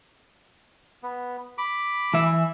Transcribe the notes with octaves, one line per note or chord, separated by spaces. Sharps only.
B3
B5 D6
E3 E5